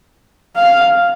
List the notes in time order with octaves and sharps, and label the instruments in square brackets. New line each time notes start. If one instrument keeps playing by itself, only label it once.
[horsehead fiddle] F5